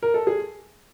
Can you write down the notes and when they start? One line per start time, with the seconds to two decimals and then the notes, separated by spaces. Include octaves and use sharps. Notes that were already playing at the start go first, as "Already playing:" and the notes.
0.03 A#4
0.14 A4
0.27 G#4